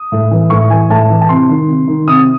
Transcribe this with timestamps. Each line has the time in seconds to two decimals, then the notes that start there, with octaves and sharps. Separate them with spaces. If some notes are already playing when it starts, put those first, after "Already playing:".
Already playing: D#6
0.12 A2
0.31 E3
0.50 A2 C#6
0.70 E3 G#5
0.90 A2 A5
1.10 E3
1.21 A5
1.29 C3 C6
1.49 D#3
1.68 C3
1.88 D#3
2.08 C3 D#6